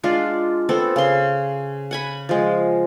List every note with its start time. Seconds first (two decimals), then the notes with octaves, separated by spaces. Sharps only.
0.04 G#3 D4 F4
0.69 B3 C4 A4
0.96 C#3 C6
1.91 F#5 G#5 B5
2.29 F3 G#3